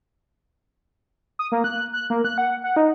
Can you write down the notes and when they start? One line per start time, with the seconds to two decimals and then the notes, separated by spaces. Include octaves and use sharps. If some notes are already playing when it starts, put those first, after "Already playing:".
1.39 D#6
1.52 A#3
1.64 F#6
1.93 F#6
2.10 A#3
2.25 F#6
2.38 F#5
2.64 F#5
2.76 D#4